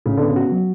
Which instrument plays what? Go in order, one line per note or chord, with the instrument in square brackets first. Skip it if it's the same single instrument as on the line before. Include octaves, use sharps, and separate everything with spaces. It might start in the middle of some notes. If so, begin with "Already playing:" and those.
[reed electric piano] A2 [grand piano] C#3
[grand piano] D3 [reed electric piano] B3
[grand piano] C#3
[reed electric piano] F#4
F#3